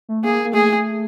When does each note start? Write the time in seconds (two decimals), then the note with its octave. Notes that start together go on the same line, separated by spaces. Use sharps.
0.09 A3
0.24 A#3 G#4
0.45 A#3
0.54 A3 G#4